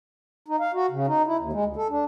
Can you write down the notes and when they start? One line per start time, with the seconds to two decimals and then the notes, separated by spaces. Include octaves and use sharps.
0.48 D#4
0.60 F5
0.74 F#4
0.91 C#3
1.07 D#4
1.27 E4
1.39 D#2
1.53 G#3
1.65 D2
1.76 A4
1.90 D4